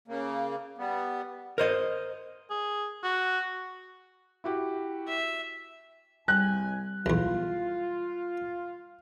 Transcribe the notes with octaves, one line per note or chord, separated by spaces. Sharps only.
C#3 A#3
G3 B3
A#4 C5 D#5
G#4
F#4
E4 F#4 G4
E5
C2 G3 G#5 F#6
B1 E2 F4